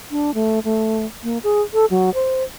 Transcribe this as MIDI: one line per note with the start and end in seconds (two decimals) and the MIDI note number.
0.11 0.34 62
0.34 0.59 57
0.64 1.05 57
1.23 1.38 58
1.44 1.62 68
1.74 1.85 69
1.90 2.13 54
2.14 2.43 72